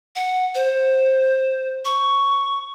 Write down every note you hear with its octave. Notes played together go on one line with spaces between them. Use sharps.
F#5
C5
C#6